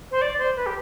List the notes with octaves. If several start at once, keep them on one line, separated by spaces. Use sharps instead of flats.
C5
D5
C5
B4
G4